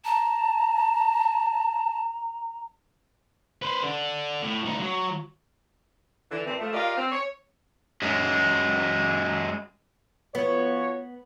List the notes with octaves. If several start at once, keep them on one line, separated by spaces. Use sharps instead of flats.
A5 A#5
B4 C5
D3
A2
D2 D#4
F#3
D3 E3
G2 A#2 E3 A3 C4
F3 A3
F4 G4 A#4 D5 D#5 F5
C4
C#5
F#2 G#3
F3 B3 F#4 C#5